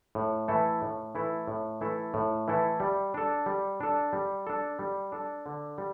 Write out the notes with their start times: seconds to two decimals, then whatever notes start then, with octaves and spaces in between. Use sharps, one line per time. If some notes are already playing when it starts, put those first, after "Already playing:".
0.15 A2
0.48 E3 A3 E4 A4
0.82 A2
1.15 E3 A3 E4 A4
1.47 A2
1.81 E3 A3 E4 A4
2.14 A2
2.48 E3 A3 E4 A4
2.80 G3
3.14 D4 A4
3.46 G3
3.81 D4 A4
4.13 G3
4.47 D4 A4
4.79 G3
5.12 D4 A4
5.46 D3
5.78 G3